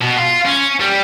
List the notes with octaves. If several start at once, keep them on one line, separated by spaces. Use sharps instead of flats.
B2
F4
C#4
G3